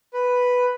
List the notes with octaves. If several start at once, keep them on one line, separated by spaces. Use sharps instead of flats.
B4